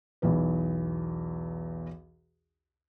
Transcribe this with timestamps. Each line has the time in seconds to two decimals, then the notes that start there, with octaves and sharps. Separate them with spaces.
0.22 B1 E2 B4